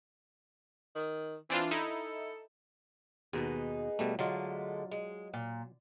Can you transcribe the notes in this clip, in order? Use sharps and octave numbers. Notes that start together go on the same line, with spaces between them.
D#3
E3 C4 D4 F4
D#4 E4 A4
D#2 B2 B3 D#4 G#4
B2 G3 A3
D3 F#3 G#3 A3 F4
G#3
A#2